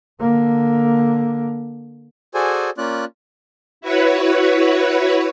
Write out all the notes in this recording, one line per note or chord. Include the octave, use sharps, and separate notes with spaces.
D3 A#3
F#4 G#4 A4 C5 D5 G#5
A#3 C#4 F4 D5 F#6
E4 F#4 B4 C#5